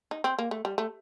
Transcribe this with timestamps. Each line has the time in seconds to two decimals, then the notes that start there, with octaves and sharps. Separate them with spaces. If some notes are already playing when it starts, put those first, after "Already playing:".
0.11 D#4
0.24 C4
0.39 A#3
0.51 A3
0.65 G3
0.78 A3